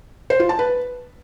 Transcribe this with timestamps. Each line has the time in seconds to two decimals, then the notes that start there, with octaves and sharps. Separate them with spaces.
0.30 C5
0.40 F4
0.49 A5
0.59 B4